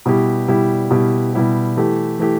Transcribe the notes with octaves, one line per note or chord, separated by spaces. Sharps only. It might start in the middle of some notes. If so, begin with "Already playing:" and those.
B2 G3 E4 G4
B2 G3 E4 G4
B2 G3 E4 G4
B2 G3 E4 G4
E3 A3 G4
E3 A3 G4